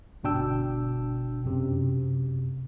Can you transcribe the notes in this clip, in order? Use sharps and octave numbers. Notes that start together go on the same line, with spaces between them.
G1 B2 D4 G5 E6
F#2 C3